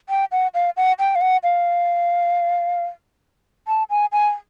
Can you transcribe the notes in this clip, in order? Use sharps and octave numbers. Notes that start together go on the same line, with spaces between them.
G5
F#5
F5
F#5
G5
F5
F#5
F5
A5
G#5
G#5